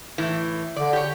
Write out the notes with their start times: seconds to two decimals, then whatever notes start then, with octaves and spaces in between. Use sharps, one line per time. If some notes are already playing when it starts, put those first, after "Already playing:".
0.18 A2 E3
0.76 D3 D5
0.93 G4 C#5